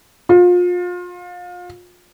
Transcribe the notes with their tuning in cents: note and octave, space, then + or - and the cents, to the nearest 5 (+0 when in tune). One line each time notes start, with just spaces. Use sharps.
F4 +30